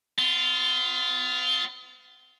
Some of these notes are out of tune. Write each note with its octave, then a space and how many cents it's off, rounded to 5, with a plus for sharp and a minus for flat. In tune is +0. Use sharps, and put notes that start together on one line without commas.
B3 +45 F4 +0